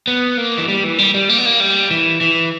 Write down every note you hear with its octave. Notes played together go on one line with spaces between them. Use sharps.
B3
A#3
E3
G3
E3
G3
G3
A#3
B3
A#3
G3
E3
E3